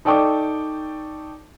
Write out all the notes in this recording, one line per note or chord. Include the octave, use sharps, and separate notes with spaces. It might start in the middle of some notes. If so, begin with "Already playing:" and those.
D#4 A4 D5 G5 C#6 D6